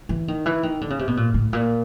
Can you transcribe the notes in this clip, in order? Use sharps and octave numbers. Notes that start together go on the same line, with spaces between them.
E3
D#3
E3
D#3
D3
C#3
C3
B2
A#2
A2
A#2